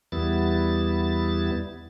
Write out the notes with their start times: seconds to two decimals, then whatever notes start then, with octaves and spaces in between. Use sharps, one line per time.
0.12 E2 G3 B3 E4 A6